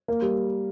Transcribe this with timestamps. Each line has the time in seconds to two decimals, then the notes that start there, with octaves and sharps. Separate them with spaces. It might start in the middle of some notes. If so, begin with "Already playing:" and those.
0.08 A#3
0.22 G3